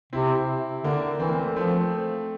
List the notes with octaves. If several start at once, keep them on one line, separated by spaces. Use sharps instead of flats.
C3 C4 E4
D3 A#3 D4
E3 C4
A#3
A3 C4
F3 A3 C4